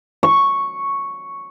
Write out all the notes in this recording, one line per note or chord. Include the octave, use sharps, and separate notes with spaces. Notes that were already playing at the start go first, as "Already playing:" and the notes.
C#6